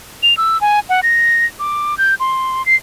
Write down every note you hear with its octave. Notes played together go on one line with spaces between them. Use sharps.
F7
E6
G#5
F#5
A#6
D6
G6
C6
C7